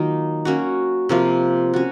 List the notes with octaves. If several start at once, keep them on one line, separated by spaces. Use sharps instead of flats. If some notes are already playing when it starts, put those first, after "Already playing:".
Already playing: D#3 F#3 A#3 D#4 F4
A#3 C#4 F#4
C3 F3 A#3 F4
C#4 F#4